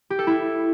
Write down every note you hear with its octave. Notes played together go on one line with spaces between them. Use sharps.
G4
A4
E4